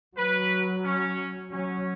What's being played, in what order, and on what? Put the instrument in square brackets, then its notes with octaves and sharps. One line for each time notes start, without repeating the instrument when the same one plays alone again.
[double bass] F#3 [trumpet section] B4
[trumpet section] C#4
[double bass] F#3 [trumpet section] C#4